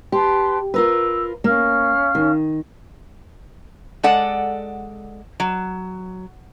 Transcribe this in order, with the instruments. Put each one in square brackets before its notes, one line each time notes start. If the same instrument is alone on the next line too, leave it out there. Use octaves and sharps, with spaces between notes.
[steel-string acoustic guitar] G4 [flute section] B4 A5 C6
[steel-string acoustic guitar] F4 A#4 B4 [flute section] E6
[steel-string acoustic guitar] A#3 [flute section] C#4 F5 F6
[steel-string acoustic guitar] D#3
[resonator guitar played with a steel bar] G#3 A4 D5 F#5
F#3